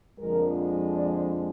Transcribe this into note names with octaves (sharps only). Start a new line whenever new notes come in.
F2 D3 F3 G#3 A#4
D5